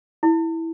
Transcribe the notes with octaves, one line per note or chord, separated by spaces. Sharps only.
E4